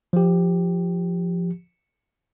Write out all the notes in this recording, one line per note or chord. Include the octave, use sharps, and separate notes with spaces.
F3 G4